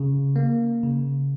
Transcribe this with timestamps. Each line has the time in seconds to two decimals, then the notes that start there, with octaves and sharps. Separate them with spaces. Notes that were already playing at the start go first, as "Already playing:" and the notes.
Already playing: C#3
0.36 A#3
0.83 C#3